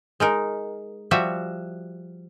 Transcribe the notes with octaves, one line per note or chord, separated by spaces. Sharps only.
G#3 D#4 A#4
F3 G3 F#4 E5